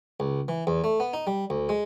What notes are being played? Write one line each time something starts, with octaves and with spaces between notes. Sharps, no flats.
C#2
E3
E2
A3
B3
D#4
G3
D2
G#3